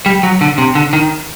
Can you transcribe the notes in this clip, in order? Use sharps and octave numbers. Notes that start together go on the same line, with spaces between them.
G3
F#3
D3
C3
D3
D#3